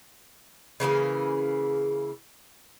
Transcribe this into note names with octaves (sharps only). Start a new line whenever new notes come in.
C#3 E3 A#3 G#4